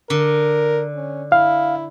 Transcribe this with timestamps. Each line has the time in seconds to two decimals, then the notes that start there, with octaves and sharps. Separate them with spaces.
0.10 D3 A#4
0.96 C#4
1.32 E4 F5